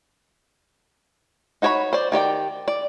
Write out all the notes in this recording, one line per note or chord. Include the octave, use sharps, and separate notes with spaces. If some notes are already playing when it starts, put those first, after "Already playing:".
D#4 F#4 C#5 D5 B5
C5 D5
D#3 G4 D5 G5
D5